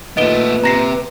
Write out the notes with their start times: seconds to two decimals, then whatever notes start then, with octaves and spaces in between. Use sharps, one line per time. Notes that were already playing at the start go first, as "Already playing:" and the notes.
0.17 D#2 A#2 A3 B3 B4 D#5 D7 G7
0.64 C3 A#5 A#6 C7